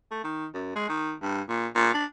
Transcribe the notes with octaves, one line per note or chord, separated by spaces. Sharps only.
A3
D#3
F#2
G#3
D#3
G2
A#2
A#2
D4